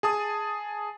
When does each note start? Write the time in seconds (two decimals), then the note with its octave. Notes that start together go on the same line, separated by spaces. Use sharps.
0.03 G#4 A5 D#6